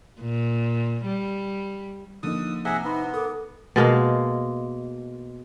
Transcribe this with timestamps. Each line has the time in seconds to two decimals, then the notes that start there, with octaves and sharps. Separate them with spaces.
0.21 A#2
1.05 G3
2.23 D3 F3 A#3 D#4 D#6
2.65 C3 G#4 E5 F#5
2.84 B3 D#4 F#5 B5 C6
3.14 A4 A#4 D6 D#6
3.76 B2 G#3 A#3 F5